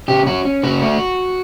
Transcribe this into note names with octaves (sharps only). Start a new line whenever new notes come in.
C#3 G4
C#4 F#4
C#4
C#3 F#4
A3